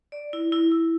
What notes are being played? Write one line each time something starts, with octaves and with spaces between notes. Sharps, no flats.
D5
E4
E4
E4